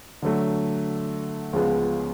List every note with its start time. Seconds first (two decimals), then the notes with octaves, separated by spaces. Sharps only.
0.22 D3 F#3 A3
1.53 C#2 C#3 F3 G#3 B3